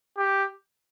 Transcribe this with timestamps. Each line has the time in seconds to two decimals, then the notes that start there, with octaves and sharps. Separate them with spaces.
0.17 G4